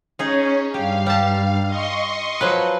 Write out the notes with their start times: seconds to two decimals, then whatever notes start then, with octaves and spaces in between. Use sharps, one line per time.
0.19 C#4 D#4 G#4 C#5
0.74 G2 G4 F5
1.06 G3 A5
1.67 D#5 C6 C#6
2.41 F3 F#3 B4